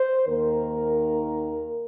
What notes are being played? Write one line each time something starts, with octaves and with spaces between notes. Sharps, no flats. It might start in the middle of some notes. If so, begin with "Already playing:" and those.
Already playing: C5
D#2 D#3 A#3 A#4